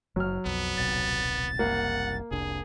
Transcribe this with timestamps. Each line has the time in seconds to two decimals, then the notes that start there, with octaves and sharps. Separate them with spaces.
0.16 F#1 F#3 F6
0.45 B1 F2 B3
0.77 D#1 B1 C3 A6
1.59 F#1 C2 A#3 F#5
2.31 F1 C2 D4 G#4